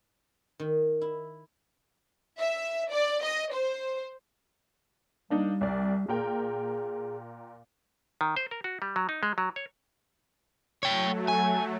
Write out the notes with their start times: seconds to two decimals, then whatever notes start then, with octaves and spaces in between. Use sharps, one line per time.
0.60 D#3
1.01 E4
2.39 E5
2.91 D5
3.23 D#5
3.52 C5
5.30 G3 A#3 D4 D#4
5.61 C2 D5
6.08 A#2 G#4 A#4 G5
8.21 D#3
8.36 C5
8.51 A#4
8.64 F#4
8.82 G3
8.96 F#3
9.09 D#4
9.23 G#3
9.38 F#3
9.56 C#5
10.83 F#3 A3 C#5 G5
11.28 G#5